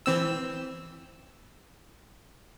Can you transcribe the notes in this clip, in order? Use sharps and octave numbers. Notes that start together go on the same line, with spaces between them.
E3 C4 E6